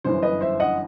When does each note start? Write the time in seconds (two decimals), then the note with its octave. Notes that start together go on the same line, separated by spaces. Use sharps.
0.04 G1 F#2 E3 C5
0.23 B4 D#5
0.41 C5 E5
0.60 D#5 F#5